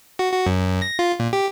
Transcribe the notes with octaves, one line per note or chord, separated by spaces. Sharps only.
F#4
F#4
F#2
A#6
F4
A#2
G4